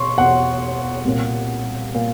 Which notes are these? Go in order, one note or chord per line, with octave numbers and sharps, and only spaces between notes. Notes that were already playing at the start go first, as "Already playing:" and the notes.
Already playing: B2 C6 C#6
E2 B2 F#5
C2 A#2
A#2